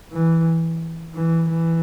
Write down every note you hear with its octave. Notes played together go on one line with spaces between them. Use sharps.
E3
E3
E3